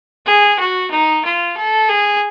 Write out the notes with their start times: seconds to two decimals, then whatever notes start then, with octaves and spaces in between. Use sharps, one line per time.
0.26 G#4
0.59 F#4
0.91 D#4
1.24 F4
1.57 A4
1.89 G#4